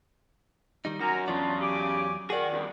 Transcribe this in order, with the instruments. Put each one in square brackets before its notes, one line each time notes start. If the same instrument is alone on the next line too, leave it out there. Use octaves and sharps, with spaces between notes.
[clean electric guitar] D#3 G3 D#4
[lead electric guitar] F#2 [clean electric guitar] F#4 [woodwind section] A#4 G#5 A#5
[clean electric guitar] E2 F#3 D5 [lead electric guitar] C#3 [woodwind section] D4 F4
[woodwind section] G4 G#5 D6
[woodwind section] D#3 [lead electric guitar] F#4 [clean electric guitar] G#4 D5
[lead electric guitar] E2 G2